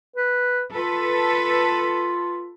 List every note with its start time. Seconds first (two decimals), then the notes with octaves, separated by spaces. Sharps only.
0.16 B4
0.73 F4 A4 B4